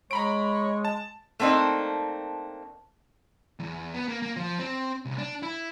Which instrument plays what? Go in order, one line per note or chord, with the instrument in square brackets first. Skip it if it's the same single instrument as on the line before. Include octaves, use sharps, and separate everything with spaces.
[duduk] G#3 [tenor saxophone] C#5 [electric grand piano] A#5 B5 D7
[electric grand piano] A5
[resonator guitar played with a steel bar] A3 A#3 C4 D4 D#4
[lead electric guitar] E2
B3
A#3
A#3
F3
C4
C2
D4
E4